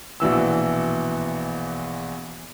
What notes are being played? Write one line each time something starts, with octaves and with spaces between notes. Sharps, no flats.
A#1 B2 E3 E6